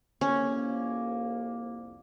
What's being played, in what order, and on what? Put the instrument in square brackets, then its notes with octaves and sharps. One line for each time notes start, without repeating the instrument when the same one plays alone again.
[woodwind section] C2 F2 A#3 [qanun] C#4